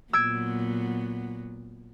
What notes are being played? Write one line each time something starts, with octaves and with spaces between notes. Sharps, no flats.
A#2 F#3 B3 E6 G#6 D7